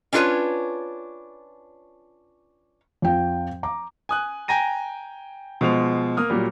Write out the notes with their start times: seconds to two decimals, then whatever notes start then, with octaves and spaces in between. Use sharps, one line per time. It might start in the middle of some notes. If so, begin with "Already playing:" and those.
0.13 C#4 D4 F4 G#4 B4 C#5
3.02 F2 F3 G5
3.63 A#5 D6
4.09 G#5 D#6 F#6
4.48 G5 G#5 A#5 A#6 D#7
5.61 B2 F3 G#3 C5 F7
6.17 A#3 D#6 F6
6.30 A#2 F#3 G3